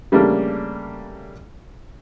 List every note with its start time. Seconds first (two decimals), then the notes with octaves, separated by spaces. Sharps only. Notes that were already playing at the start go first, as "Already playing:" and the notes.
0.12 C#3 G3 A3 A#3 D4